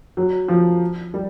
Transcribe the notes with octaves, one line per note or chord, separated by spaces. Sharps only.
F#3
F3
G3